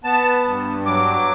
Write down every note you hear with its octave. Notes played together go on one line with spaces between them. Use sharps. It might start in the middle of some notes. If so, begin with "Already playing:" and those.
B3 A5
G2
F#3 D6